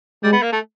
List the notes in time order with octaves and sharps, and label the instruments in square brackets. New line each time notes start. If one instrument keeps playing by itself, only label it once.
[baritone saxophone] G3 [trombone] G#3
[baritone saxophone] B3
A#3
A3